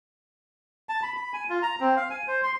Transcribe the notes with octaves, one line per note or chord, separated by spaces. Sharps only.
A5
B5
B5
G#5
F4
A#5
C4
F5
G#5
C5
C6